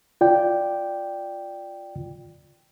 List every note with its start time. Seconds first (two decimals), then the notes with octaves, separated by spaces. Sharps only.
0.21 F4 D5 G5